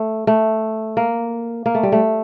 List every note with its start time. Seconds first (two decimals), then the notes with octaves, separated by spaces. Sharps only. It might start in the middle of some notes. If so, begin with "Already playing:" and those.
Already playing: A3
0.27 A3
0.97 A#3
1.66 A#3
1.75 A3
1.83 G3
1.92 A3